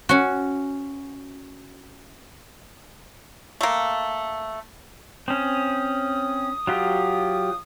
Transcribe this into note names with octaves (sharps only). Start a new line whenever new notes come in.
C#4 F#4
A3 A#3
C4 C#4 D#6
F#3 F4 G4